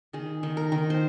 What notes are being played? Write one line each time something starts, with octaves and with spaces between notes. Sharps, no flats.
D#3 G#4
D#3
A#4
D#3
C5